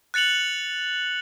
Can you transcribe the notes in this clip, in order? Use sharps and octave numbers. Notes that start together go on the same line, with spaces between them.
F#6 A6 C#7 F7 F#7